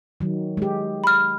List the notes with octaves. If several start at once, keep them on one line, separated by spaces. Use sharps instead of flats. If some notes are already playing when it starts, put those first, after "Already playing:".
D#3 F#3
G#3 G4
B5 F6